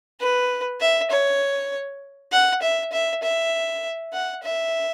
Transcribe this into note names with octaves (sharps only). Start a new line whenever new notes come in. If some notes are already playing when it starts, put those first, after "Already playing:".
B4
E5
C#5
F#5
E5
E5
E5
F#5
E5